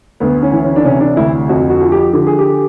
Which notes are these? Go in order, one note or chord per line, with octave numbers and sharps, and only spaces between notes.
D2 B3
C#4
E3
C#4
D4
C3 C#4
D4
D2 E4
F2 F#4
F#4
F3
G4
D3 G4
G#4
G4